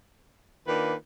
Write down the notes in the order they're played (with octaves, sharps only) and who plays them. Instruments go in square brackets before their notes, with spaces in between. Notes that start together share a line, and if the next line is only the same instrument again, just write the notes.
[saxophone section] D#3 A#3 D4 F4 B4